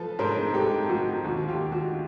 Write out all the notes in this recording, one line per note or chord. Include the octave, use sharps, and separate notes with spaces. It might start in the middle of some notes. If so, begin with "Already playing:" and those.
Already playing: F3 A4 B4
G#2 A#4 C5
G#2 G4 A4
F3 F#4
D#2 F#4
F4 G4
D#2
F#4